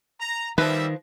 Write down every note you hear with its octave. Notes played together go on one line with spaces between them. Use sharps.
A#5
D#3 F3 G3 B4 E5